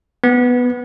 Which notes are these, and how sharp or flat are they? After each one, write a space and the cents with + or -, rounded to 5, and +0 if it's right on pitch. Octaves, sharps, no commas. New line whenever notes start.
B3 +0 B4 +0